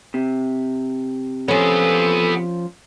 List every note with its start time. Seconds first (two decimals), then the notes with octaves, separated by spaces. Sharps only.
0.14 C3
1.48 F3 B3 C#4 G#4 A4